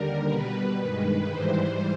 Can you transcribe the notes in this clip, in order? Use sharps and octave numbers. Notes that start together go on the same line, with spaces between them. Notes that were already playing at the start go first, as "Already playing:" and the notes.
Already playing: D#2 D3 G3 A#4
B2 G3 B4
G2 D#3 G#3 B4
G#2 E3 G3 C5